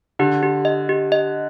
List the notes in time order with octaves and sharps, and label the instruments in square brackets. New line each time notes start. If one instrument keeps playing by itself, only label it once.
[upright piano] D3 [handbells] G4
[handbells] G4
D#5
G4
D#5